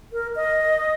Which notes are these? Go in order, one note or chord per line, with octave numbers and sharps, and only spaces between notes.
A#4
D#5